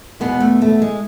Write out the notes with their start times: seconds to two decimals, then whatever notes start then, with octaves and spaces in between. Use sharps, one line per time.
0.20 E2 B2 G#3 B3
0.40 A3
0.62 A3
0.82 G#3